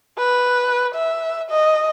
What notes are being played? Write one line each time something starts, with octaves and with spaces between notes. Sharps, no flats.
B4
E5
D#5